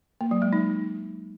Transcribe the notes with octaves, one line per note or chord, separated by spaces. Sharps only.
A#3
F#3
G#3
D#4